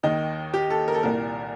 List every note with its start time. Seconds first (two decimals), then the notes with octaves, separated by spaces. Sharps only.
0.03 D#2 D#3 D#4
0.54 G4
0.70 A4
0.88 A#4
0.94 A4
1.03 C2 A#2 A#4